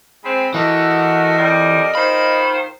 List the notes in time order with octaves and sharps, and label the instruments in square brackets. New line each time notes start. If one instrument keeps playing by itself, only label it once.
[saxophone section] G#3 C4 [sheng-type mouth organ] B5
[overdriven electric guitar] E3 [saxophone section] A3 F#4 [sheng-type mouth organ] A#4 D#5
[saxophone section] F2 G3
[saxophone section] D#3 F4 C5 [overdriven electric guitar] B5